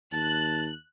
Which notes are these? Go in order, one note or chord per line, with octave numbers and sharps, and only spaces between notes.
D#2 A5 F#6